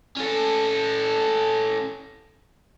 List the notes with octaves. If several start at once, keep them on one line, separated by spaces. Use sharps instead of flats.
C#4 A4